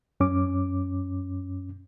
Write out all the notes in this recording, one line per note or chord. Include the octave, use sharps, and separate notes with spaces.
F#2 C#4 D6